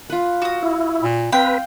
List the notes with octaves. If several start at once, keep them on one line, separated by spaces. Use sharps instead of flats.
F4 B4
F#4 D#6
E4
A#2
C4 B4 F5 G5